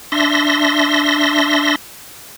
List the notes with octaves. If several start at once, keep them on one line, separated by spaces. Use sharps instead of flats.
D4 E5 C6 A#6